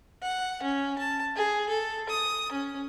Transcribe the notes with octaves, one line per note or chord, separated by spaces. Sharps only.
F#5
C#4
A5
G#4
A4
D#6
C#4